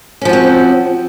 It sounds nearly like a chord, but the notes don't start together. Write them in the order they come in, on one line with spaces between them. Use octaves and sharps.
C#4 F3 F#4 C4